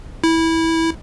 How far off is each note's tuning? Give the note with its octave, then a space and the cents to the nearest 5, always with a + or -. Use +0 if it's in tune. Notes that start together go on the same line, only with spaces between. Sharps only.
E4 -15